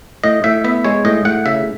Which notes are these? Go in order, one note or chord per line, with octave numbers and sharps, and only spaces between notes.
A2 D#5
A2 E5
B3 E5
G#3 C#5
A2 D#5
A2 F#5
C#3 E5